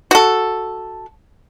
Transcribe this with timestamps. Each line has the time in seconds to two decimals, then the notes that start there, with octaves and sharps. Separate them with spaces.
0.11 F#4 A4